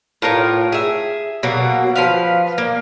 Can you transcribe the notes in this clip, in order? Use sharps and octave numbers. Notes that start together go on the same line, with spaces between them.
A2 F4 A#4 C#5
G#4 E5
B2 F#3 A#3
F3 B4 F5
A#3